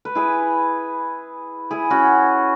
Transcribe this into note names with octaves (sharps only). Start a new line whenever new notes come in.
B4
E4 G#4
E4 G#4
C#4 F#4